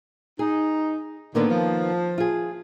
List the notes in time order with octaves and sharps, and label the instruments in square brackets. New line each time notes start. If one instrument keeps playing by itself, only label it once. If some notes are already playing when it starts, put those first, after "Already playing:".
[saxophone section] D#4 [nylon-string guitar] G#4
[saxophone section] A2 D3 [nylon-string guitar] D#3 A#3 B3
[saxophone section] F3
[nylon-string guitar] F4 G#4